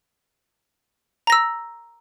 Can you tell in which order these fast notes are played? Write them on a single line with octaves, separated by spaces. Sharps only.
A#5 A#6 E6